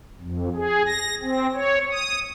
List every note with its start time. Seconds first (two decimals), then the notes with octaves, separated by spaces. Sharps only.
0.21 F2
0.55 G#4
0.86 A#6
1.21 C4
1.55 C#5
1.91 D#6